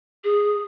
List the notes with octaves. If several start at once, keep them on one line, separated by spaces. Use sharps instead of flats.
G#4